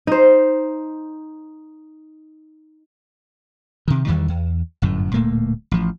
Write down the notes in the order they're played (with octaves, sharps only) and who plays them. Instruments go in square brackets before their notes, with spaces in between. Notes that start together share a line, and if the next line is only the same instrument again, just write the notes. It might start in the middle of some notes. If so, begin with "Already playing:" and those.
[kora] D#4 C5
[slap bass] C3 D#3
E2 D#3 E3 G3
E2
G1 F#2 A2
D1 A#2 A3 A#3
A1 F3